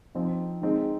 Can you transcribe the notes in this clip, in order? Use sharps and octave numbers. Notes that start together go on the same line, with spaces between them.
F3 C4 D#4
D#3 G#3 C4 D#4